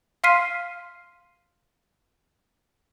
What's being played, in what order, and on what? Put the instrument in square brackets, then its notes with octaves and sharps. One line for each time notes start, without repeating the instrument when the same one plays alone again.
[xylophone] F5 C6 F6 B6 C7 D#7